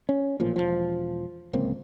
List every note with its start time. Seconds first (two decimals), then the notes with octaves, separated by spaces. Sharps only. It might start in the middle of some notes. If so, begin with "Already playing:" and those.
0.09 C#4
0.40 A1 A#2 F3
0.56 E1 C#2 F3
1.53 D1 C#2 A#3 C4